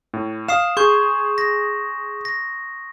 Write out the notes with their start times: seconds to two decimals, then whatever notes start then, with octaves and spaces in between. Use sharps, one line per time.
0.14 A2
0.48 F5 D#6 C7 E7
0.77 G#4 C6 C#6 G6
1.38 A#6
2.25 A#6